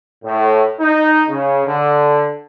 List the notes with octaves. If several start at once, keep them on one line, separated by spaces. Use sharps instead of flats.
A2
D#4
C#3
D3